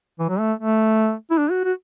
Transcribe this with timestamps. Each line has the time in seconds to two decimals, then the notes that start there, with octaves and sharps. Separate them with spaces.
0.19 E3
0.29 F#3
0.39 A3
0.59 A3
1.30 E4
1.38 D4
1.50 F#4
1.64 F#4